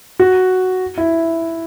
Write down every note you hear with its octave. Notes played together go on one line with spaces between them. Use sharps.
F#4
E4